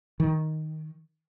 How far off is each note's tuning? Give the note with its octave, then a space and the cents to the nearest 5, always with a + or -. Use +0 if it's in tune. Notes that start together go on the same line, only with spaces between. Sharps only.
D#3 +5